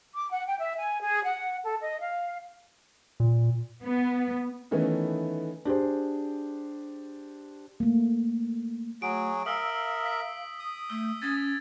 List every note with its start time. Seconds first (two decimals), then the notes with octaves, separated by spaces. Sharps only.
0.15 D6
0.31 F#5
0.46 G5
0.59 E5
0.78 G#5
1.02 G#4
1.24 F#5
1.64 A4
1.80 D#5
2.00 F5
3.20 A#2
3.83 B3
4.71 D#3 E3 A3 B3 C#4 D#4
5.65 D4 G4 G#4 C5
7.80 A3 A#3
9.02 F#3 A3 F#4 G#4 D7
9.46 A#4 E5 F5 D#6 E6
10.06 B6
10.59 D#6
10.90 A3 E6
11.22 C#4 G#6 A6